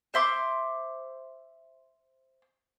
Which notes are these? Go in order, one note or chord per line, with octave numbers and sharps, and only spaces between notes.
C5 E5 C6 D6